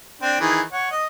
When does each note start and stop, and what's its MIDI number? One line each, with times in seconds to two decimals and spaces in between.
0.22 0.39 60
0.22 0.39 62
0.41 0.61 51
0.41 0.61 52
0.41 0.61 68
0.73 0.89 73
0.73 0.89 78
0.91 1.05 75